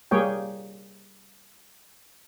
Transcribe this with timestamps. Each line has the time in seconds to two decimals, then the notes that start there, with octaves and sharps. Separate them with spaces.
0.11 G3 A#3 G#4 C#5 G5